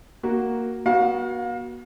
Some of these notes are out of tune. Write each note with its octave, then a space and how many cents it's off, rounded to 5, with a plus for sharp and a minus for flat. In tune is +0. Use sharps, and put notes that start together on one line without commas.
A#3 +0 F#4 +0
B3 -45 F#4 +0 F5 +30